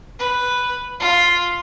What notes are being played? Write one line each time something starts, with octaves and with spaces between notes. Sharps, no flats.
B4
F4